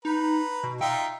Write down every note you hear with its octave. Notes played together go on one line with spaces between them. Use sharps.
D#4 B4 A#5
B2
D#4 F4 E5 G5